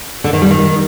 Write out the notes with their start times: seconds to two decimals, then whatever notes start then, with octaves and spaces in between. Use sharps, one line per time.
0.24 D3
0.33 D#3
0.42 G3
0.50 D#3